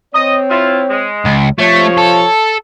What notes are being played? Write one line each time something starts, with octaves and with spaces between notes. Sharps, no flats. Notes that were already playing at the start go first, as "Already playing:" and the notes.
C4 C#5 D#5
E4 F4
G#3
C#2
C3 F3 A3 C#5
A4